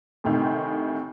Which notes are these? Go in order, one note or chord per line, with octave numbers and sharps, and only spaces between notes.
D2 A2 C3 D#3